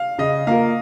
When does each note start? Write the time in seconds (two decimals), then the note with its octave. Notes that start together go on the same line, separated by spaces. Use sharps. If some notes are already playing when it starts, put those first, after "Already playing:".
Already playing: F5
0.18 C#3 D#5
0.47 A#3 F4 A#4 F5